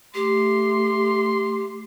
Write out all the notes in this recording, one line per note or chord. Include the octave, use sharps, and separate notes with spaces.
A3 G4 C6